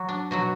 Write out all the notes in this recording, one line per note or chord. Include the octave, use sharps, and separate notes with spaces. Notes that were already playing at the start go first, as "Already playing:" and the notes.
Already playing: F#3 F#4
D4
B2 F#3 F#4